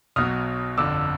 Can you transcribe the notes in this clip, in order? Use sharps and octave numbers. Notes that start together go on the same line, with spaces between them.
B1 B2 F#3 D#6 F6
G1 F2 D3 D6 E6